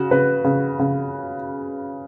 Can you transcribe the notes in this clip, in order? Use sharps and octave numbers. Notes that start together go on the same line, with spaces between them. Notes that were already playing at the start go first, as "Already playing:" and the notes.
Already playing: C#3 F#4
C#3 B4
C#3
C#3